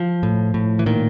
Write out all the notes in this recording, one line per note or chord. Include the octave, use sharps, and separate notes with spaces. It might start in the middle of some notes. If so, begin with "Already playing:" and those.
Already playing: F3
A2
A2
E3
A#2 D#3